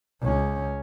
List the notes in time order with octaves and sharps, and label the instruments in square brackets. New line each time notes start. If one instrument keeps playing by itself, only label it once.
[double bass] C#2 C#4